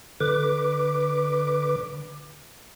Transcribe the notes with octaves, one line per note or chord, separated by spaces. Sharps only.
D3 B4 D6